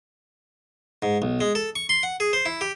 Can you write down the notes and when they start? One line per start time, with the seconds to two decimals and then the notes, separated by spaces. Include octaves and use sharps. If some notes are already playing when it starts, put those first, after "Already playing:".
1.02 G#2
1.22 B1
1.41 G#3
1.55 A4
1.76 C#6
1.89 C6
2.03 F#5
2.20 G#4
2.33 C5
2.46 E4
2.61 G4